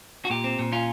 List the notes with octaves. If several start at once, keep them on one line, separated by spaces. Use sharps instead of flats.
F#4
A#2 G4
C4
A#2
C#4 F4